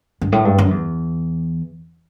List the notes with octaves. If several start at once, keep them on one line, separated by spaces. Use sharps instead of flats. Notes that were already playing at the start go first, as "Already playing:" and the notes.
G2
A2
G2
F#2
E2